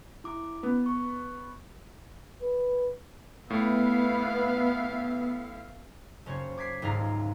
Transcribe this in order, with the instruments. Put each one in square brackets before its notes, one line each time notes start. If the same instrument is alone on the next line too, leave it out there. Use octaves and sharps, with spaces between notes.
[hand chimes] E4 D6
[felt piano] B3
[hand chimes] C#6
[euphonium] B4
[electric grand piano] A2 [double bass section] B3 [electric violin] E5 F5
[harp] F#1 C#4 C5 C#5
D6 G#6 B6 C7
D#1 C#2 G#2 F5 A#5 C7